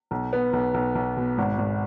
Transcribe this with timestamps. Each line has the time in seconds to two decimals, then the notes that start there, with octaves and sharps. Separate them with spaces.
0.11 B1
0.33 B3
0.53 B1
0.74 B1
0.95 B1
1.17 B2
1.38 G#1
1.58 G#1